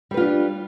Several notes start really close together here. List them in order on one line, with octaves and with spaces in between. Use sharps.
G3 B4 F4 D4